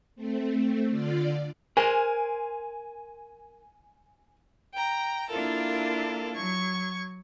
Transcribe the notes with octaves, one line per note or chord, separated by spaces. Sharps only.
A3 C4
D3 F4 D5
A#4 C5 G#5
G5 A#5
A#3 D4 E4 F4 A4 A#4
F#3 C#6 G#6